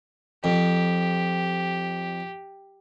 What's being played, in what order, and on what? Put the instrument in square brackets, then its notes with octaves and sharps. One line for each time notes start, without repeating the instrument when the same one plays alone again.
[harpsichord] F2 [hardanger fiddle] G4